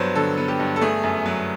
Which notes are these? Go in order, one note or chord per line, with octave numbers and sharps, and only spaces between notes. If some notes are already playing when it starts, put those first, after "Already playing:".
Already playing: G2 F#3 B3 C5 C#5
D3 A4
B3
G4
G2
A4
A3 G#4
F#2
F#3